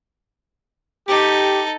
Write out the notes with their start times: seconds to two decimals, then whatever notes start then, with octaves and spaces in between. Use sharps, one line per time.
1.09 D#4 G4 A4